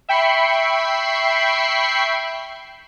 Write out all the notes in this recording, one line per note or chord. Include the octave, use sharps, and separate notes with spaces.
E5 G5 B5 C#6 C7